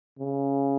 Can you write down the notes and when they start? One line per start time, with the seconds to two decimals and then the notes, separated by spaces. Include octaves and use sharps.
0.19 C#3